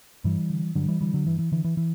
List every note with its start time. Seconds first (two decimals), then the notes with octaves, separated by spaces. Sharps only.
0.24 G2 E3 G3
0.50 D3
0.75 G2 D3 F#3
0.88 E3 G3
1.01 D3 E3 G3
1.14 D3 F#3
1.27 G2 E3
1.39 E3
1.52 D3 E3
1.64 E3
1.77 E3